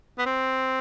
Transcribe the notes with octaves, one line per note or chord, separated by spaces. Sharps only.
B3
C4